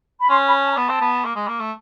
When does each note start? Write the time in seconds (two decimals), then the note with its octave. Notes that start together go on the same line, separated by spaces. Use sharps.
0.21 B5
0.29 C#4 C6
0.46 B5
0.61 A5
0.71 A#5
0.77 B3 A5
0.89 C4
1.01 B3
1.25 A#3
1.36 G#3
1.48 A#3
1.60 A3